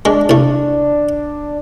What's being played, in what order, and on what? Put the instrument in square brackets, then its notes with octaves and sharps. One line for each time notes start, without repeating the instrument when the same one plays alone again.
[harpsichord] G#3 [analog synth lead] D4
[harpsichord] C2 A3